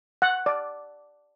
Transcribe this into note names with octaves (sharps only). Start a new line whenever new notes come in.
F#5
D5